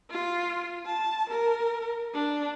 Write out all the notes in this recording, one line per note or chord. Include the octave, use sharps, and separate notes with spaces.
F4
A5
A#4
D4